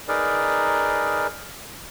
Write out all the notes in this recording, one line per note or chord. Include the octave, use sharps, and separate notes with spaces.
D#4 G#4 A#4 B4 D5